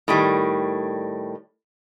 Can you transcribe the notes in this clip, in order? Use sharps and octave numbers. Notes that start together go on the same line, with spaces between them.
A2 D#3 G3